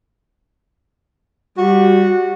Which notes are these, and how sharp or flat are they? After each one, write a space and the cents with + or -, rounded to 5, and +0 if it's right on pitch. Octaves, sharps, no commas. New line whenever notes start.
G3 +0 F#4 -15